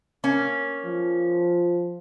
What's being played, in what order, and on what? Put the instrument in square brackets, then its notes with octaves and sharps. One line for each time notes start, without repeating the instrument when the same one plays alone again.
[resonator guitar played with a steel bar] A#3 C#4
[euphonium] F3